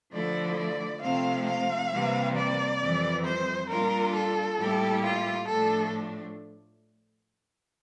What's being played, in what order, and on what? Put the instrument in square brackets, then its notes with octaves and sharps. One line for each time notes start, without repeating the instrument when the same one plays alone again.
[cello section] D3 F3 A3 E4 [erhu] D5
[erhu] D5
[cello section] C3 F3 A3 C4 [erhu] F5
[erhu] F5
[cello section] C3 E3 G3 A#3
[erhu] D5
[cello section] F2 E3 G3
[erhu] C5
[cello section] A#2 G3 D4 F4 [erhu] A#4
[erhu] A4
[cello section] A2 G3 A#3 E4 G4
[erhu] F4
[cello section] A2 F3 A3 D4 [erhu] A4